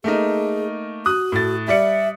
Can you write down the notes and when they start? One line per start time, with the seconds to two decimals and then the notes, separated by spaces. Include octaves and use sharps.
0.04 A3 A#3 D#4 G#4
1.06 F#4 D#6 F#6
1.32 A2 A6
1.68 G3 D5 E5 C#7